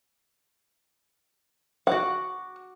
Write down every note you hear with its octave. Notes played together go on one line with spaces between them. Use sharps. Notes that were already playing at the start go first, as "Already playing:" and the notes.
F#4 F#5 D6